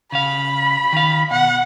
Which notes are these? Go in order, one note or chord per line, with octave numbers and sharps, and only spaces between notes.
C#3 F5 B5
D#3 F5
B2 F#5